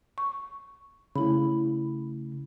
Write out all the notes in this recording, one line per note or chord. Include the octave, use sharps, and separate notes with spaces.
C#6
C#3 A3 E4 B5